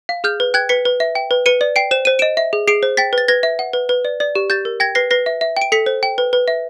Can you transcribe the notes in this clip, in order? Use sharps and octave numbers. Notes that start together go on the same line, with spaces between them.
F5
G#4 F6 G6
B4
G5 F#6 G#6
B4 B6 C#7
B4
E5
G5
B4
B4 C#7 D#7
D5
G5 C7 D7
C5 E7
C5 D#7
D#5 D7 E7
E5
G#4
G#4 C7 D7
C5
G5 A6 B6
B4 A6
B4 G#6 A#6
E5
F#5
B4
B4
D5
D5
G4
G4 G6 A6
A#4
G5 G#6 A#6
B4 A#6 C7
B4 A#6 C7
E5
E5
G5 D7
A4 B6 C#7
C5
G5
B4
B4
E5